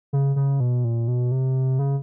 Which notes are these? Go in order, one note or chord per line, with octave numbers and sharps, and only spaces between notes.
C#3
C#3
B2
A#2
B2
C3
C#3